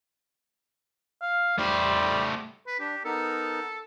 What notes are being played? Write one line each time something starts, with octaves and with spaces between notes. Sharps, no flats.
F5
G3 A3 C5
B4
D4 G4
B3 D#4 A4 A#4